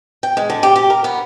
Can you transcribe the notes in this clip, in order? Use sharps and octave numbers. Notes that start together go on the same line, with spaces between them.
G5
G#3
D3
G4
G4
A#4
B3